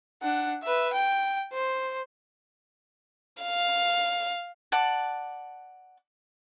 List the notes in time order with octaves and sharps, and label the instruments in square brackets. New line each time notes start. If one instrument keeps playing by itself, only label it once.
[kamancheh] D4 F#5
B4 E5
G5
C5
[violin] F5
[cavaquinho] D5 F#5 A5